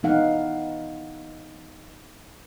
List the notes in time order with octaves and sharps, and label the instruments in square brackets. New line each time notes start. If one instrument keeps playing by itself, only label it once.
[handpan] E3 B3 D#4 F5 F#5